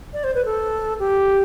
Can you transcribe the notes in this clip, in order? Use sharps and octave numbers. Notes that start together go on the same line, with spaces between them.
D5
C5
B4
A4
G4